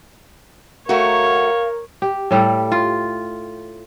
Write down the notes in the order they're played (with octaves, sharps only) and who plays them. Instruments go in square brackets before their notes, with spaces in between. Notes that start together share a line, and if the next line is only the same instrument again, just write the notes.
[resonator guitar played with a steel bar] A3 F#4 [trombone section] A#4 [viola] C#5 [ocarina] F5
[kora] G4
A2 G3 G4 A4
F4